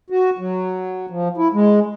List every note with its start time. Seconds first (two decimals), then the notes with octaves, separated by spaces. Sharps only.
0.10 F#4
0.38 F#3
1.10 F3
1.37 E4
1.53 G#3